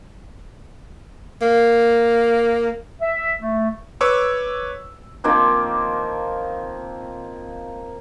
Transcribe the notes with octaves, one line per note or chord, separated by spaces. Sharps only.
A#3
E5
A3
B4 C#5 C#6 D6 E6
D#3 F3 A#3 C4